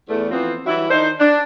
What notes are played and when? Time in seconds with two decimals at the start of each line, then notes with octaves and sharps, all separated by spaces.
0.09 E2 A3
0.31 E3 F3 B3 C4
0.66 E3 F#3 G3 E4
0.89 D#3 D4 D#4 C5
1.19 D4